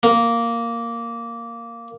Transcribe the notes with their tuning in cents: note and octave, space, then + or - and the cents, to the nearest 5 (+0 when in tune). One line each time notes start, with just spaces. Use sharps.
A#3 -5